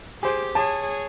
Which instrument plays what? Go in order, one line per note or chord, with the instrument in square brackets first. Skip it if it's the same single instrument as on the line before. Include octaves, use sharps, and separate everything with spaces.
[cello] G4 [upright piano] G#4 C5
[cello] G#4 C#5 [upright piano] A5